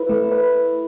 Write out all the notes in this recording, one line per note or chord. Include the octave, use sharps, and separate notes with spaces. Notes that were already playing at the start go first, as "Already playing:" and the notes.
Already playing: E4 B4
A3
B4